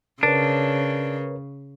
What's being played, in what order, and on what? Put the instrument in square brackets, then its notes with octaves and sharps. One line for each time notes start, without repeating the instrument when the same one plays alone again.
[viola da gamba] C#3 [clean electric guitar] D4 [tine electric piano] A#4 B4 C#5